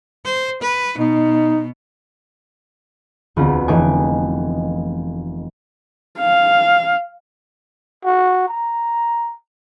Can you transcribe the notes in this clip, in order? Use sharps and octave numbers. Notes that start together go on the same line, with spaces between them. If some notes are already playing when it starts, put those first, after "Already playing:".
C5
B4
B2 D#4
E1 D2 B3 C4 F4
F1 E3 A3 D#5 G#5 D6
F5
F#4
A#5